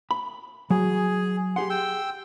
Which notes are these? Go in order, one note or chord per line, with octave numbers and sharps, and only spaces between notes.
B5
F#3 G#4
G4 G#4 F#5 C6
G5 E6